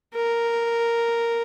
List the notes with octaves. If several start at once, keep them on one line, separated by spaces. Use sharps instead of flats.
A#4